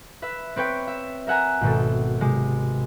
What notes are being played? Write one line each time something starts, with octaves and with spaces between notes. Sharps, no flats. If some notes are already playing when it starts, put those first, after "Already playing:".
B4 E5
C4 B4 C#5 G5
E5
A#4 E5 F#5 G#5 A#5
G#1 B2 A4
C3 G#3